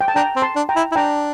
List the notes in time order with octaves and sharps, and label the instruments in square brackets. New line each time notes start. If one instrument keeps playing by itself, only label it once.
[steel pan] G5
A5
[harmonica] D4 [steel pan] G5 A#5
[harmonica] C4
[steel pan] A5 C6
[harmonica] D4
[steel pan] G5 A#5
[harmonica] E4
E4
[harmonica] D4 [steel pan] G5 A#5